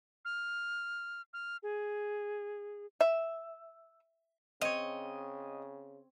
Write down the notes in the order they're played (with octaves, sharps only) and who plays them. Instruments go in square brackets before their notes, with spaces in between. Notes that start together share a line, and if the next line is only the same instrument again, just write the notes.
[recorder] F6
F6
G#4
[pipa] E5
[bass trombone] C#3 [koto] C4 C#5 [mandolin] D#5